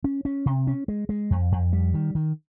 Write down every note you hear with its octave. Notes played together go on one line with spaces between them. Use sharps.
C#4
C#4
C3
C#4
G#3
G#3
F2
F2
G3
D#3
D#3